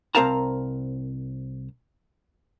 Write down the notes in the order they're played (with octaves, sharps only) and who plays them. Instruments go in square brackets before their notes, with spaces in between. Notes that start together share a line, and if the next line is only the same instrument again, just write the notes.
[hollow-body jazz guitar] C2 C4 A#4 F5 A5 A#5